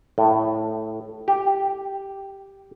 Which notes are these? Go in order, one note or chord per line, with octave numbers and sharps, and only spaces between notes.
A2
G4